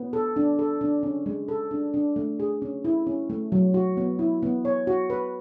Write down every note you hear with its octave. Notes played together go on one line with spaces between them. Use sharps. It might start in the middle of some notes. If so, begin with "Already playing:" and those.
Already playing: B3
A4
D4
A4
D4
C#4
G#3
A4
D4
D4
A3
G#4
C#4
E4
C#4
A3
F#3
F#4
B3
E4
B3
C#5
F#4
B4